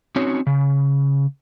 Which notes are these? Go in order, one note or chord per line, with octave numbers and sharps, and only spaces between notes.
C4 C#4 D#4 F#4 C#5
C#3